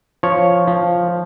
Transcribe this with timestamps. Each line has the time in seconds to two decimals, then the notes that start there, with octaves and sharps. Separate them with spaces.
0.23 F3 C#5
0.67 F3